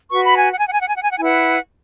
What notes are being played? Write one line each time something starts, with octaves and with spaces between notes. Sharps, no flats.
F#4 B4 C#6
B5
G#5
F#5
G#5
F#5
G#5
F#5
G#5
F#5
G#5
F#5
G#5
E4 B4 F#5